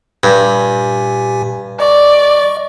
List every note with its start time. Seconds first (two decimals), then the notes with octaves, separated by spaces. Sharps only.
0.23 G2 A#2 G4 G#5
1.80 D5 D#5 C#6